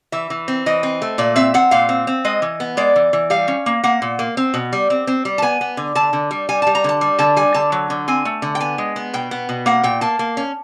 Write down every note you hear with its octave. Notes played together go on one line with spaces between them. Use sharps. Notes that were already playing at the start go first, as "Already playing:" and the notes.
E3 E5
E3
C4
E3 D#5
C4
A3
A#2 D5
C4 E5
C4 F#5
A#2 F5
C4
C4
G#3 D#5
E3
B3
G#3 D5
E3
E3
G3 F5
C#4
A#3
A#3 F#5
A#2
A#3
C4
B2
G3
C4
C4
G3
A5
B3 G#5
B3
D3
D3 A5
D3
G3
G3 G#5
G3 A5
A#5
D3 A5
G3
D3 A5
G3 G#5
D3 A5
F#3
D3
C4 G#5
A3
D3
G5
B3 G#5
G#3
B3
B2 G5
B3
B2
A#3 F#5
A#2 G5
A#3 A5
A#3
C#4